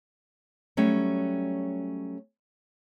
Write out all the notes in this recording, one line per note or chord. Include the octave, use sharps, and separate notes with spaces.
F#3 G3 A3 C#4